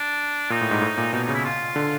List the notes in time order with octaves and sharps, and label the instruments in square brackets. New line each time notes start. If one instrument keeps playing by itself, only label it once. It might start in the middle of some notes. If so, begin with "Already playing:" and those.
Already playing: [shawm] D4
[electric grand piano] A#2 [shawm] D#4
[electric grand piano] A2
G#2
A2
A#2
[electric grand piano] B2 [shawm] D#4
[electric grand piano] C#3 [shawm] D#4
[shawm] E4
F4
[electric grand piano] D3